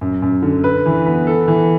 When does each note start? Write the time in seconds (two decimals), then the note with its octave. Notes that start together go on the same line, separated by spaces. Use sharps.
0.01 F#2
0.22 F#2
0.42 D3
0.64 B4
0.86 E3
1.06 B3
1.27 A4
1.48 E3